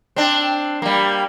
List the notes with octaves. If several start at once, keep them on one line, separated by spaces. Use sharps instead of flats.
C4 D4
G3 A#3